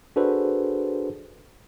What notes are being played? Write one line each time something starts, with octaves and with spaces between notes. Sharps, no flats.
D4 F#4 G#4 A4 B4 C5